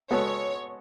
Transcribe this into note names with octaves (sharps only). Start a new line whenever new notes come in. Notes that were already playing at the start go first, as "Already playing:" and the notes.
G#3 B3 F#4 A4 C#5